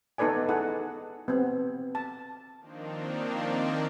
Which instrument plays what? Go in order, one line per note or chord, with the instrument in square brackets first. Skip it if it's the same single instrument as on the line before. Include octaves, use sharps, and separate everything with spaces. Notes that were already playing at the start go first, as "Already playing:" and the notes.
[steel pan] B3 D#4 A4 B4 D5 G#5
D#4 E4 G#4 A4 F#5
B3 C4
A5
[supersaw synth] D#3 F3 A#3 C4 D4 D#4